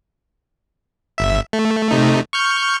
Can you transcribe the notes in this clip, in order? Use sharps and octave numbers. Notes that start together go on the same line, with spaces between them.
G1 E5
A3
C3 A3 D#4
C#6 F6 G6